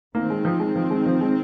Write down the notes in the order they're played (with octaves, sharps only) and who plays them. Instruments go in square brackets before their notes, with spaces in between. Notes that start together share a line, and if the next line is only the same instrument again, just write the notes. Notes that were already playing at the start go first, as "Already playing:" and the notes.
[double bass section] D#3 C4 [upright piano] A#3
[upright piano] G#3
F3
G#3
F3
G#3
F3
G#3